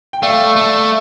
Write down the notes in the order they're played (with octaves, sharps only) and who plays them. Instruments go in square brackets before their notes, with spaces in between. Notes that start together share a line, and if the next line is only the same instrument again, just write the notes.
[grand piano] G5
[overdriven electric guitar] A3 [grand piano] D5 F5
[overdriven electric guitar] A3